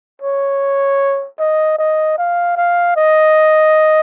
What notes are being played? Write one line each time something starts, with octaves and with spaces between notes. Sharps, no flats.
C#5
D#5
D#5
F5
F5
D#5